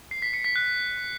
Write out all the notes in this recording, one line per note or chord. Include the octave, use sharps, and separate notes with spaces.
C7
B6
C#7
B6
F#6